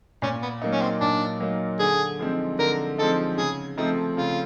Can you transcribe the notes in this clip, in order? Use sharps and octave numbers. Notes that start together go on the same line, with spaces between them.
A#2 C#4
B3
F#3 A#3 D#4
C#4
C4
A#2 D4
F#3 A#3 D#4
D3 G#4
F3 G#3 C4 D#4
D3 A#4
F3 G#3 C4 D#4 A4
C#3 G#4
F3 A3 C4 D#4
C#3 F4